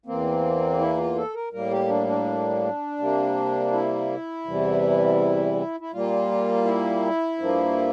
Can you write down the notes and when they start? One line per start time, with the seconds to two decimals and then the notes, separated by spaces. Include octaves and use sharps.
0.06 E2 E3 A#3 C4
0.79 E4
0.98 F4
1.15 A4
1.34 A#4
1.52 A2 G3 A#3 A#4
1.71 G4
1.88 D4
2.07 D4
2.99 C3 G3 A#3
3.72 E4
4.45 E2 C3 E3 G3
5.80 E4
5.92 A#2 G3 A#3 F4
6.65 E4
7.38 G2 F3 A#3